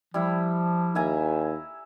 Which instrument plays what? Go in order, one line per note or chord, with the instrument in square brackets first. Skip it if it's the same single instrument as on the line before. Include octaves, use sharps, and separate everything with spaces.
[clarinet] F3 [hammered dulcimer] G3 E4
[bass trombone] D#2 [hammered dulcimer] E5 G#5 A#5